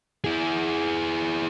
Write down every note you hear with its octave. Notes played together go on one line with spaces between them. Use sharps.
E4 G#4